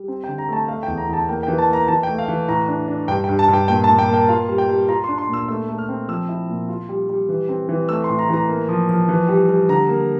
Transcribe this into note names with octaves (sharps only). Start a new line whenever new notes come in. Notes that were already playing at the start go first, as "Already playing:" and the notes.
Already playing: G3
C4
G5
D3
A#5
A3 A5
A3 F5
G5
E2
A#5
E2 A5
A#3 G5
G5
E3
A5
A#3 A#5
E3 A5
G5
A3
F5
E3
A2 A#5
D4
D4
G2 G5
G5
G2
A5
G2
G5
A#2 G5
A5
A#2
G5
A#3
G5
F4 F5
G3
G5
G3
F4 A#5
C6
D4
C6
A#2
E6
A3 E6
A3
F6
C4
F3 E6
E4
A#2
F4
G3
G3
E3
C4
E3
A3 E6
C6
A2
A#5
E3 A#5
A#3
F3
F3
E3
G3
G3
D3 A#5
A#3